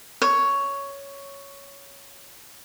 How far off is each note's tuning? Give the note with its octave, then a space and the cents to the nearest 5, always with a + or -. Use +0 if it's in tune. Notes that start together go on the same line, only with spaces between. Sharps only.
C#5 +5